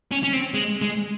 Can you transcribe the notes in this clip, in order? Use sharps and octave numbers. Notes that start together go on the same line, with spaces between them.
C#4
C#4
C4
G#3
G#3